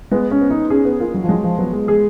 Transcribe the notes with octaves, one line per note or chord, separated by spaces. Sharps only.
G#3 B3
C#4
B3
D#4
C#4 G#4
B3
A#3 F4
F#3
F3
F#3 G#3
F3
F#3 B3
G#3
G#3 G#4